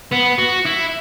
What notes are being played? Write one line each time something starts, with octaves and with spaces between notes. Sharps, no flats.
B3
F#4
E4